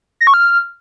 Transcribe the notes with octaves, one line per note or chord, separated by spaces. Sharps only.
A#6
C#6
F6